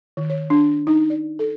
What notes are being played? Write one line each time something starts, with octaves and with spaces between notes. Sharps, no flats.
D#3
C#5
D4
D#4
D5
A4